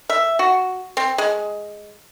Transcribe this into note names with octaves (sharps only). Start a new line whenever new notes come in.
E5
F#4
C4
G#3